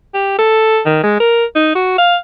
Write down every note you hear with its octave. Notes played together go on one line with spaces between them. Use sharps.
G4
A4
D#3
G#3
A#4
D#4
F#4
F5